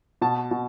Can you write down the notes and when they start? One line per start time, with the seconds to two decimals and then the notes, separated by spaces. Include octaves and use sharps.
0.21 B2 A5
0.51 B2